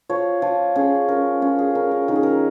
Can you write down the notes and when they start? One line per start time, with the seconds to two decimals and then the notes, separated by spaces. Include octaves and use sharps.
0.09 F3 C#5
0.42 F3
0.76 C#4 G#4
1.08 C#4 A#4
1.42 C#4 F4
1.59 G#4
1.75 C#4 A#4
1.91 A#4
2.08 D#3 A#4
2.16 G#4
2.23 A#4